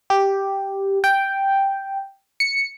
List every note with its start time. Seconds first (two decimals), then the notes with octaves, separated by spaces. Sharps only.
0.10 G4
1.04 G5
2.40 C#7